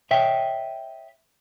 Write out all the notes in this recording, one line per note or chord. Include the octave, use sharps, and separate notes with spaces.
C#5 D#5 E5 G5